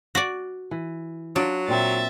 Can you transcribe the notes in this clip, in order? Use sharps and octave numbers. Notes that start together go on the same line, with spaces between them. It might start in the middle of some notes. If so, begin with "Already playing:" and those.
F#4 D5
E3
F#3 D4 F4
A#2 C4 E5 A6